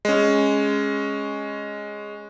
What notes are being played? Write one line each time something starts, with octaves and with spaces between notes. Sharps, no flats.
G#3 C#4